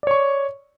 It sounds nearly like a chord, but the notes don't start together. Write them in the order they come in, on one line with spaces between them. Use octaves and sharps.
D5 C#5 C#6